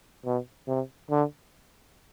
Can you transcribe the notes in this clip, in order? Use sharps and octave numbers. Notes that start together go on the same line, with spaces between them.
B2
C3
D3